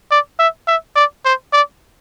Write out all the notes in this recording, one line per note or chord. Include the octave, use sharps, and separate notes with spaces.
D5
E5
E5
D5
C5
D5